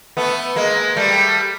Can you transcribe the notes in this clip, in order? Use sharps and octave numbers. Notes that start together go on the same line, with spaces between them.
A3 B3
G#3 A#3
G3 A3